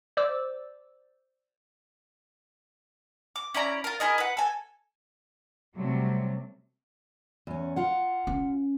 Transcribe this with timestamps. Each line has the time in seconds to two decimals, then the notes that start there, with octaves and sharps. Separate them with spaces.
0.17 C5 D5 D6 E6
3.36 D6
3.54 C#4 E4 D5 A#5
3.84 F4 A#4
4.00 E4 G#4 A#4 D#5
4.18 B4 F#5
4.37 A4 G#5
5.75 C3 F#3 G3 A3
7.47 E2 C#4
7.76 F4 F#5
8.27 C#4